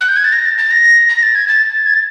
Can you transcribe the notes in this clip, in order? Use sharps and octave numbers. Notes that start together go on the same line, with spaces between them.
F#6
G6
G#6
A6
A#6
A6
A6
A#6
A#6
A6
G#6
A6
G#6
A6